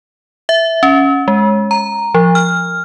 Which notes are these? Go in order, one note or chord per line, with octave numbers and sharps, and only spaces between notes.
E5
C#4
G#3
A#5
F3
F6